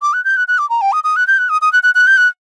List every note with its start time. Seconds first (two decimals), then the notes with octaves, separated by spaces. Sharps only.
0.02 D6
0.13 F#6
0.24 G6
0.37 F#6
0.48 F#6
0.58 D6
0.70 A#5
0.81 G5
0.92 D#6
1.04 D#6
1.16 F#6
1.27 G6
1.38 F#6
1.49 D#6
1.62 D#6
1.73 F#6
1.83 F#6
1.95 F#6
2.07 G6
2.17 F#6